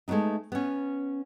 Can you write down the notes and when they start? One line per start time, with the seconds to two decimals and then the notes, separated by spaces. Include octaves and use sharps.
0.08 G#3 A3 B3 D4 D#4
0.52 B3 C#4